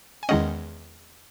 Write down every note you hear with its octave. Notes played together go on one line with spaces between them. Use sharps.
G#5
E2 D#3 G#3 C#4 D#5 F#5